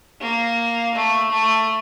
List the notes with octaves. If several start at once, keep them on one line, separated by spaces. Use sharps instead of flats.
A#3
A3
A3